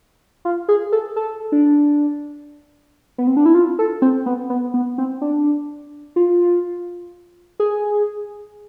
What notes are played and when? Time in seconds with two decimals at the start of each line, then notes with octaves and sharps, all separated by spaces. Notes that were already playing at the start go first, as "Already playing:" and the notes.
0.45 F4
0.68 G#4
0.92 A4
1.16 A4
1.52 D4
3.18 B3
3.27 C4
3.37 D4
3.46 E4
3.55 F4
3.79 A4
4.02 C4
4.26 B3
4.50 B3
4.74 B3
4.98 C4
5.22 D4
6.16 F4
7.60 G#4